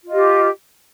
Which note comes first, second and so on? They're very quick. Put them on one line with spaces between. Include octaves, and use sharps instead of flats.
F4 D#5 G4